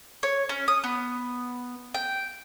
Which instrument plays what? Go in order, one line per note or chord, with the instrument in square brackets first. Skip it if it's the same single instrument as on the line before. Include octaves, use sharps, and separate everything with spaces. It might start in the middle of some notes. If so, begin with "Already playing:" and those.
[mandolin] C#5
C#4
D#6
B3
G5